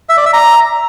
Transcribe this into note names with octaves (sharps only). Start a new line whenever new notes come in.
E5
D5
E5
A#5